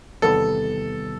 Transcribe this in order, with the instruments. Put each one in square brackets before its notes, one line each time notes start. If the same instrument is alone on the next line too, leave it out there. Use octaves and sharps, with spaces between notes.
[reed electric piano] E2 C3 D#3 G3 B3 [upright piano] A4